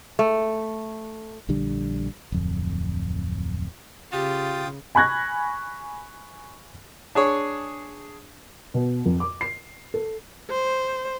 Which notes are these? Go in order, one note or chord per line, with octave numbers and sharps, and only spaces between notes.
A3
A#1 D3 G3 D4
D1 F2
C#3 F4 G4 G5 D#6 A6
G#5 B5 C#6 F#6 G#6 A#6
D4 G#4 C#5
B2
F2
D6
C7
A4
C5